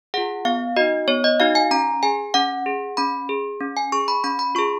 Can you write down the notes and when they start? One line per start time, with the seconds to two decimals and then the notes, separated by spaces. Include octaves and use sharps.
0.14 F4 G#4 F#5
0.45 B3 F5
0.76 D#4 F#4 D#5
1.08 B3 C#5
1.24 D#5
1.40 D#4 F#4 F5
1.55 G#5
1.71 C#4 A#5
2.03 G#4 G#5
2.34 C#4 F#5
2.66 G#4
2.97 C#4 B5
3.29 G#4
3.60 C#4
3.77 G#5
3.92 G#4 C#6
4.08 B5
4.24 C#4 B5
4.39 B5
4.55 F4 G#4 C#6